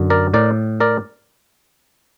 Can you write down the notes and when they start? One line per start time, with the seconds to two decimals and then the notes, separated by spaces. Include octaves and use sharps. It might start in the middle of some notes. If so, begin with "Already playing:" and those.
Already playing: F#2 D3
0.10 A#4 D5
0.34 A2 A#4 D5
0.80 A#4 D5